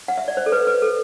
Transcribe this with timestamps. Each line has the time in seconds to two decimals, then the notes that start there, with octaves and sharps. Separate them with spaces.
0.08 F#5
0.18 E5
0.28 D5
0.37 C5
0.46 A4
0.52 B4
0.67 B4
0.82 A4